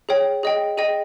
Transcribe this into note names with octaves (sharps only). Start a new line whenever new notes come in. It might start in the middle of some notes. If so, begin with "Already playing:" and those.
G#4 C#5 G5
G#4 D#5 G5
G#4 D#5 G5 D#7